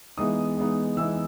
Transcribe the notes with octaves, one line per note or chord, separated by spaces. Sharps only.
E3 G#3 B3 D#4 D#6
E3 G#3 B3 D#4
E3 G#3 B3 D#4 E6